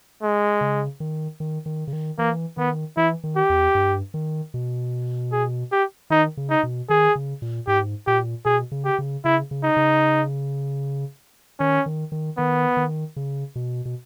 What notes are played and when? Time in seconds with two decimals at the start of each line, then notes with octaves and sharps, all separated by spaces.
0.23 G#3
0.61 C#3
1.00 D#3
1.40 D#3
1.66 D#3
1.87 C#3
1.93 D#3
2.18 E3 A#3
2.57 D#3 B3
2.97 E3 E4
3.24 D#3
3.36 G4
3.50 E2
3.75 G2
4.14 D#3
4.54 B2
5.32 G#4
5.72 G4
6.10 D#3 D#4
6.37 C#3
6.50 D#4
6.63 B2
6.89 D#3 G#4
7.15 C#3
7.42 A#2
7.67 G#2 G4
8.07 A#2 G4
8.45 B2 G#4
8.72 C#3
8.85 G4
8.99 C#3
9.24 C#3 E4
9.51 C#3
9.63 D#4
9.77 C#3
11.60 D#3 C#4
11.86 D#3
12.12 D#3
12.37 D#3 B3
12.77 D#3
13.16 C#3
13.56 B2
13.85 B2